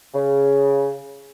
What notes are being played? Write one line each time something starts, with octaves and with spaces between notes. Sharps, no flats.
C#3